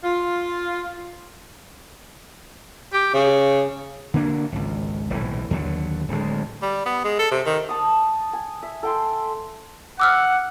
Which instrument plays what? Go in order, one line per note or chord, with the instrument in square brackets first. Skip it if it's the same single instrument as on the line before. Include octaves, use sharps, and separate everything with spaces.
[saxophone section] F4
[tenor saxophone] G4
C#3
[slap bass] D3 A#3 D4
G#1 C#2
D#1 B1 A2 E3
D#2 D3 F#3
D1 D2 G#3
[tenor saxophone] G3
B3
G#3
A4
C3
D#3
[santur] A5 D#6
G#5
E5
A4 G5 C6
[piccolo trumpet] F#5 [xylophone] D6 E6 F6